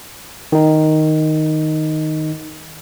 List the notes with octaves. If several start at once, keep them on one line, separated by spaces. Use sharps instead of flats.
D#3 D#4